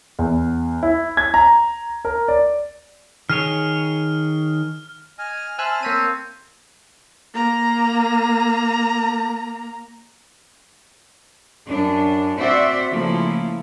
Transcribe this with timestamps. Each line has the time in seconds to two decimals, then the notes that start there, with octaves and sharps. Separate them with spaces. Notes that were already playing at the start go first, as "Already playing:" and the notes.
0.19 E2
0.83 E4
1.17 G#6
1.34 A#5
2.05 A#4
2.28 D5
3.30 D#3 G#4 C#5 F6
5.19 D#5 G#5 D#6 F6
5.59 C5 E5 G#5 A5 E6 F#6
5.83 A#3 C4 C#5 A5 B6 D#7
7.34 A#3 A#5
11.67 F#2 D4
12.39 C4 F#4 C5 D5 E5
12.93 C#3 F3 A3 A#3 E4